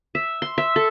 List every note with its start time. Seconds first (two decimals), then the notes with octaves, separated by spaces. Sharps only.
0.15 E5
0.42 C6
0.58 E5
0.76 A4